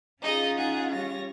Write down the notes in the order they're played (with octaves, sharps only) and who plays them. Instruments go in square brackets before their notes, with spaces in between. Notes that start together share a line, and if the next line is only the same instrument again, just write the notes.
[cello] C#4 F4 [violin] D#4 D#5 [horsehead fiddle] G#4
[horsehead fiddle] D#4 F#5 [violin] G#4
[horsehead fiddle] G3 C#5 [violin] A#6